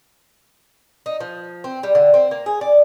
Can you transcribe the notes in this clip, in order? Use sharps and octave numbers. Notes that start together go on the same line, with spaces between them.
D#4
F3
C4
G3
D3
C4
A#3
G#4
D5